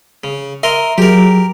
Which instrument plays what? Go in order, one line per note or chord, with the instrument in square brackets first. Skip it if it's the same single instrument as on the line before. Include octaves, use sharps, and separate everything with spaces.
[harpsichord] C#3
[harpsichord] A#4 D#5 C6 [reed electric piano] E5
[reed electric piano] F#3 G#4 [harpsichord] G4 A#4